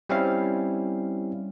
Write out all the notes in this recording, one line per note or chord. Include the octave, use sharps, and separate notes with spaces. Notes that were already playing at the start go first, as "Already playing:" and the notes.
G3 C4 C#4 E4 F5